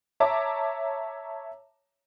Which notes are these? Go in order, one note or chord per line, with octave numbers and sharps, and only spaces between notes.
C#5 E5 A5 A#5 D6